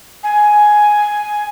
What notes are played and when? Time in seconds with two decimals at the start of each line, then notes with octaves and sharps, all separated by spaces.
0.23 G#5